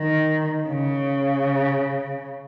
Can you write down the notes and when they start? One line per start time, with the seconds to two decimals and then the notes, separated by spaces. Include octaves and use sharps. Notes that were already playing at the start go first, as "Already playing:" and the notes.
Already playing: D#3
0.68 C#3